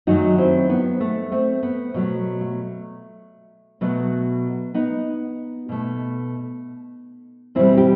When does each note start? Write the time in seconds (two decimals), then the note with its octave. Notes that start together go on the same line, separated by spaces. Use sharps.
0.07 F#2 D#3 F#3 A3 D#4 F#4
0.38 C4 E4
0.69 B3
1.00 A3
1.32 A3 C4
1.63 B3
1.94 B2 F#3 A3 B3
2.41 A3
3.81 B2 F#3 A3 B3
4.74 B3 D#4
5.69 B2 A3
7.55 E2 B2 G3 C4 E4
7.77 G4